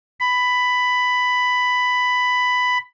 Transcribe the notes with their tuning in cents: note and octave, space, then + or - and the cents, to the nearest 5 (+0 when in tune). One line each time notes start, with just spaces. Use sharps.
B5 +10